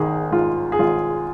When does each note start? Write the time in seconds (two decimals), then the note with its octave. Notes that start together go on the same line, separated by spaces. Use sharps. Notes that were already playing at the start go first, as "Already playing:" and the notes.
Already playing: G#1 D#3 G#4
0.31 G#2 F4
0.72 G#4
0.79 G#1 F4